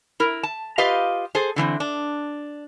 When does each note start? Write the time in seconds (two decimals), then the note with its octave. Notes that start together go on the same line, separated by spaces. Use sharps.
0.20 E4 A#4
0.43 A5
0.78 F4 G4 B4 D#5 F5
1.35 G#4 A4 C5
1.56 D3 E3 A#3 C4
1.80 D4